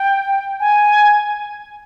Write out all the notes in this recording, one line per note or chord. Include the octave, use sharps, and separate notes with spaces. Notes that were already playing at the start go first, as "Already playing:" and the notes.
Already playing: G5
G#5